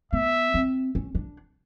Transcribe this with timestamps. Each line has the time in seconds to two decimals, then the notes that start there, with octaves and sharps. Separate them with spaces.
0.13 B3 E5
0.54 C4
0.95 C#4
1.15 D4